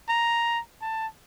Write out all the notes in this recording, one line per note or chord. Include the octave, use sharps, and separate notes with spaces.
A#5
A5